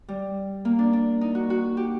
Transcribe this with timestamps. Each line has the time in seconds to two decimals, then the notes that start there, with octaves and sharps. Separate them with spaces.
0.09 G3
0.65 A#3
0.79 D4
0.93 D4
1.21 D#4
1.35 F#4
1.50 F#4
1.77 G4